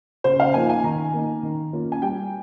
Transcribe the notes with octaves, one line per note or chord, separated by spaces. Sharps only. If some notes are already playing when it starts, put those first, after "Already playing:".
C#3 C5
F5
F3 A#3 D#4 G#5
G#5
D#3 A#5
A#3 D#4
D#3
A#3 C#4 F4
G#5
G3 G5